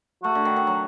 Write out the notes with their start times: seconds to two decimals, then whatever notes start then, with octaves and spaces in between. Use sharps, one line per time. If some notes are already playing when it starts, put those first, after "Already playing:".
0.24 A3 F#4
0.35 D3
0.45 D#3
0.56 D#3
0.67 F#3